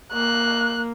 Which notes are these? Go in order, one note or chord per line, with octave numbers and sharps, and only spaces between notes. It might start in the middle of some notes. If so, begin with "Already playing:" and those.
A#3 F#6